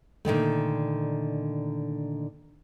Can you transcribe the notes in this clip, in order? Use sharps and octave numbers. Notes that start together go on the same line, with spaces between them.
A#2 D3 D#3 A3